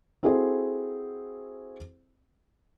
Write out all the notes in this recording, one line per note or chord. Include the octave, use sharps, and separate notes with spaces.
C4 E4 F#4 G#4 A4 C5